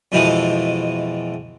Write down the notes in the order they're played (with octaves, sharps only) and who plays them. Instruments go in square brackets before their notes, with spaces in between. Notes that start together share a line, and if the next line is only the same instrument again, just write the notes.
[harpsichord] F2 B2 E3 F3 G#3 A3